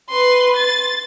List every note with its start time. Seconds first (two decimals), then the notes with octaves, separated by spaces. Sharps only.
0.10 B4 C6
0.56 A6